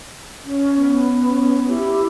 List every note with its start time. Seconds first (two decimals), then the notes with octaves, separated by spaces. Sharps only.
0.44 C#4
0.77 B3
1.22 C#4
1.68 E4 G4